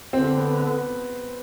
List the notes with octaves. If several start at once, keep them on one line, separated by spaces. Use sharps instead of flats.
D3 C4
B3
B3